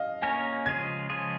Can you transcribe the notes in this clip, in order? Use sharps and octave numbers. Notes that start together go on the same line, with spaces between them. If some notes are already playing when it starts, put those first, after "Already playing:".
Already playing: D#5 F5
A#3 C#4 A#4 C#5 G#5
C#3 F3 G#3 F4 G#4 G#6
C#3 F3 G#3 F4 G#4